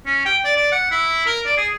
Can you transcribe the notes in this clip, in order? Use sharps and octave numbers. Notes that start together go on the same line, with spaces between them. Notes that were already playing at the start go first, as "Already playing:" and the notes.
C#4
G5
D5
D5
F#5
E4
A#4
D5
G#4